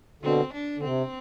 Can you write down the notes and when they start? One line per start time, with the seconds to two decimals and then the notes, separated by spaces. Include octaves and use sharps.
0.23 B2 D3 C4
0.54 D4
0.77 D3
0.84 C3 C4